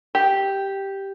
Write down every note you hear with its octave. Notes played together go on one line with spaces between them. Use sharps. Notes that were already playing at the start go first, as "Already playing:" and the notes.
G4